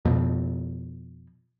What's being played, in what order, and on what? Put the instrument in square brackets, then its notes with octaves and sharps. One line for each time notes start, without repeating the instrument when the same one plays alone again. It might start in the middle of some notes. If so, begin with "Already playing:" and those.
[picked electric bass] F2 B2